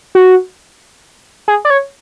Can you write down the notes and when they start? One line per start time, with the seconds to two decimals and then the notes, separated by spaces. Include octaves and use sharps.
0.15 F#4
1.48 G#4
1.65 D5
1.70 C#5